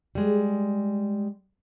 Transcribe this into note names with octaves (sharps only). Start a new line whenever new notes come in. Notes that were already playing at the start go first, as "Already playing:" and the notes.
G3 G#3